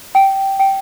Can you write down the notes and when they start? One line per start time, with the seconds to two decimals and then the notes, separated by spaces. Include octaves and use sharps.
0.15 G5
0.59 G5